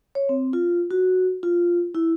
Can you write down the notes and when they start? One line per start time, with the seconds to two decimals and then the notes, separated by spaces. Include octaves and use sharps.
0.15 C#5
0.29 C4
0.53 F4
0.91 F#4
1.43 F4
1.95 E4